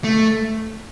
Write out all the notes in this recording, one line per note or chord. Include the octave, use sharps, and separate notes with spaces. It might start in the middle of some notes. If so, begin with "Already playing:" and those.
A3